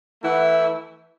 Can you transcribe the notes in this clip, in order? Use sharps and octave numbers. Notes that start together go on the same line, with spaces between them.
E3 A3 E4 F#5